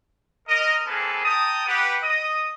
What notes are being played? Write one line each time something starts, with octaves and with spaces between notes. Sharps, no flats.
A#4 D#5
A#3 C4 D4 G#4 A4 B4
G5 A5 A#5 D#6
G4 B4 F#5
D#5 D#6